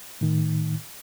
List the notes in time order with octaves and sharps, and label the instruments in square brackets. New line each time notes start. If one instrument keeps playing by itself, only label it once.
[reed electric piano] A2 D#3